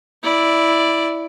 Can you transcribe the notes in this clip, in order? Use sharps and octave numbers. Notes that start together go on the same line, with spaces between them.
E4 D5